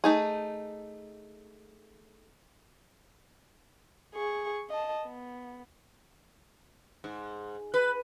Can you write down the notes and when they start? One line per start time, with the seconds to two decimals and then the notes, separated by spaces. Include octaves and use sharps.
0.04 A3 D#4 G#4
4.15 G#4 C#6
4.70 D#5 A5
5.05 B3
7.04 G#2
7.74 B4